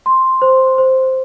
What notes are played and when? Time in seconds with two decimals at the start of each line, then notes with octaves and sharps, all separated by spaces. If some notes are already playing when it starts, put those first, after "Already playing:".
0.06 C6
0.42 C5
0.78 C5